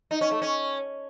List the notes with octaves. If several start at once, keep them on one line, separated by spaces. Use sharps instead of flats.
D#4
C#4
A3
C#4